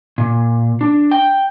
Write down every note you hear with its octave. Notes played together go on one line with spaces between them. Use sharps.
A#2
D4
G5